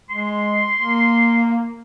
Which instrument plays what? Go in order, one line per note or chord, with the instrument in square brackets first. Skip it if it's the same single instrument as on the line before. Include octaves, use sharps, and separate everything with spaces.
[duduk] G#3 [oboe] C6
[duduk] A#3